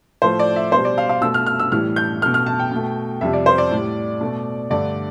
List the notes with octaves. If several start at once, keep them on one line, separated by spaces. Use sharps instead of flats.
A2 F3 A3 C5
D5
E5
B2 G3 C5
D5
F5
F5
B2 A3 E6
F6
F6
E6
A2 E3 G3 F6
G6
B2 A3 F6
F6
A5
G5
B2 A3
F2 C3 G3 E5
D5
C5
D5
A2 G3
B2 A3
G2 D3 A3 D5